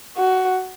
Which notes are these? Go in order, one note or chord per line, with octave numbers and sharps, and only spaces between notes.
F#4